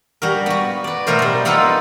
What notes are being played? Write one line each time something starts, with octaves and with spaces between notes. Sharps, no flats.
G3 F#4 A#4
B3 F#4
B4 D5
B2 A3 A#4 C5
G3 A#4
A#3 B3 D#4 F4 A4 B4